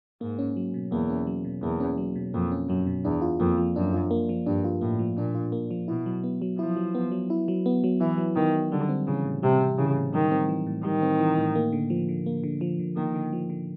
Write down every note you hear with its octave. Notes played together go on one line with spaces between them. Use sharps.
G#2 A#3
C#4
F#3
B2
E2 A#3
C#4
F#3
B2
E2 A#3
C#4
F#3
B2
F2 A#3
C#4
F#2 F#3
B2
E2 D4
F4
F2 A#3
F3
F#2 D4
F4
A#3
F3
G2 D4
F4
A2 A#3
F3
A#2 D4
F4
A#3
F3
B2 E4
F#3
B3
F#3
F3 E4
F#3
B3
F#3
E4
F#3
B3
F#3
E3 E4
F#3
D#3 B3
F#3
D3 G3
C4
C#3 E3
A2
C3 G3
C4
C#3 E3
A2
D#3 G3
C4
E3
A2
D#3 G3
C4
E3
A2
A#3
D3
F3
D3
A#3
D3
F3
D3
D#3 A#3
D3
F3
D3